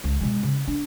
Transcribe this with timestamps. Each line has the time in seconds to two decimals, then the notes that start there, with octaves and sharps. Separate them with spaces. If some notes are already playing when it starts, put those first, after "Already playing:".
0.04 C#2
0.21 B2 G#3
0.43 C#3
0.68 D4